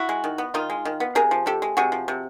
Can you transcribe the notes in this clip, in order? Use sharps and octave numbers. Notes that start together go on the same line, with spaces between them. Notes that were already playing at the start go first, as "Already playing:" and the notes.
Already playing: E4 F#4
G#3
D#3
B3
D#3 D#4 F4
G#3
D#3
B3
C3 G#4 A#4
F3
C3 G4 A4
G#3
C3 F#4 G#4
F3
C3